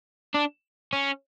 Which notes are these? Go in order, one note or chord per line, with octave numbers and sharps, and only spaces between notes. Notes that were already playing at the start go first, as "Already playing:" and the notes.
D4
C#4